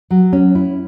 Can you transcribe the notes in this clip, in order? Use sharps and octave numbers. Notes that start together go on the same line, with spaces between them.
F#3
C#4
E4